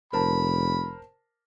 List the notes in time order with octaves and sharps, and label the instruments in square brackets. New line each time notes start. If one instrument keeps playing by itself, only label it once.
[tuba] F1 [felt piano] A#4 C5 A5 [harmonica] B5